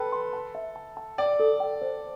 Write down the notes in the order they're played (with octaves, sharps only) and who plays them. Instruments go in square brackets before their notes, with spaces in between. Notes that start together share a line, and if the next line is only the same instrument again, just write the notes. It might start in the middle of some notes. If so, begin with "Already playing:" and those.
Already playing: [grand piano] A4 B4 [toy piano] G5
[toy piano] C6
A5
E5
A5
A5
[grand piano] D5 [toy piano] G5
[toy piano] A4
G5
C5